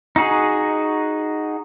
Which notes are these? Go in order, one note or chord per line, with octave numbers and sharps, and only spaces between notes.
D#4 F#4 G#4